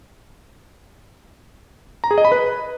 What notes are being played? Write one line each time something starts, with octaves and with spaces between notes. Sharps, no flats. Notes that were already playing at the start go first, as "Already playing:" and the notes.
A#5
G#4
D#5
B5
B4